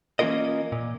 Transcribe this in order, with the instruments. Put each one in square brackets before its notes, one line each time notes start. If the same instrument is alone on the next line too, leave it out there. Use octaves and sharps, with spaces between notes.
[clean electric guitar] E3 A#3 C#4 F4 A#4 D#5
A#2